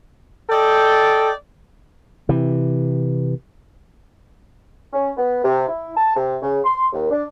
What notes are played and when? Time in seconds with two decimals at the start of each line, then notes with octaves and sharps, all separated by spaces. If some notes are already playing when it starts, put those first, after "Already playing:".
0.50 A4 D5 D#5 G5
2.29 C3 E3
4.93 C#4
5.17 B3
5.44 C3
5.68 E4
5.96 A5
6.16 C3
6.42 C#3
6.64 C6
6.92 D#2
7.10 D4